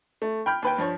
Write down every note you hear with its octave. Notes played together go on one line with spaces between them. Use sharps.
A3
G5 B5 F6 G6
D#2 B4 G5
G2 F3 C#5